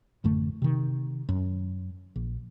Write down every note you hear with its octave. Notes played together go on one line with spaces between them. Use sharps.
A1 F#2 D3 A3
C3 D#3
F#2
A#1